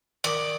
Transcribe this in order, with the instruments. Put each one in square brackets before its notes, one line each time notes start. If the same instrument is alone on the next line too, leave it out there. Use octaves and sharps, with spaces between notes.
[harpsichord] D#3 [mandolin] D5